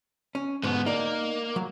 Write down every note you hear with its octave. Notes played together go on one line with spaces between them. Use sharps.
C#4
D2 G#2 B2 B3
A#3 D#4 D5
F#3